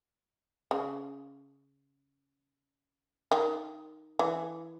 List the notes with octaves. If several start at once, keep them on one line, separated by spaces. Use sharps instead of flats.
C#3
D#3
E3